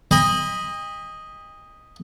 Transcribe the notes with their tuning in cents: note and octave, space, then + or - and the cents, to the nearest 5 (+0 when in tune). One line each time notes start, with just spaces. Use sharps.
D#5 +0 G5 +45 B5 -10